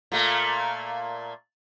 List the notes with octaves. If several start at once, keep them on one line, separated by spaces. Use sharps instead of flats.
A#2 A3 A#3